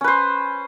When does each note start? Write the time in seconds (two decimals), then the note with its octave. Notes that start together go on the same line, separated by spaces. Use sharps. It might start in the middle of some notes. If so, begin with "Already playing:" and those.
0.01 C#4
0.04 B4
0.08 C5